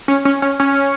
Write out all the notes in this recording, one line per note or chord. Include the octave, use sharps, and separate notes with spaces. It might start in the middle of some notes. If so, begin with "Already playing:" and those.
C#4
C#4
C#4
C#4